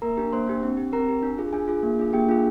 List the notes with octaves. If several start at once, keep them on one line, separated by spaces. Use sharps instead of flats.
A#3 A#4 A#5
D4 G4
A#3 C5 C6
D4 G4
C4
G4
C4 A#4 A#5
G4
D4
F4 G#4
D4 G#4 G#5
F4 G#4
A#3
D4 F4 G#4
A#3 G4 G5
D4 F4 G#4